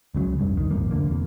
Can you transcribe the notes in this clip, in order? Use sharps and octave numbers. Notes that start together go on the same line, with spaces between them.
C#2 C#3 F#3
F1 C2 G2
D#3
D#1 G#1 F2 A#3
F1 C#2 D3 A#3
F2